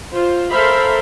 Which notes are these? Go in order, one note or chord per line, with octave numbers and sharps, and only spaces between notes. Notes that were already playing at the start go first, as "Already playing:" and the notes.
F4 C5
A4 A#4 C5 E5 F5 B5